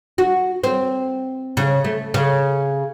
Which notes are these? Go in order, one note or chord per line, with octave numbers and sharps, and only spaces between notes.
F#4
C4
C#3
A3
C#3